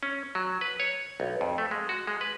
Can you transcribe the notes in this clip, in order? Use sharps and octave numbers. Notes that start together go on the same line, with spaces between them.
C#4
F#3
B4
C#5
B1
F2
A3
G#3
F#4
G#3
B4